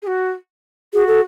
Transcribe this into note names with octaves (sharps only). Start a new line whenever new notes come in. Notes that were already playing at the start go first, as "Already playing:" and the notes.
G#4
F#4
F#4 G#4
A4